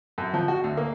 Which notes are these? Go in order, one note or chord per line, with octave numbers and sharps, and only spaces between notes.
F#2
F3
F#4
D2
A#3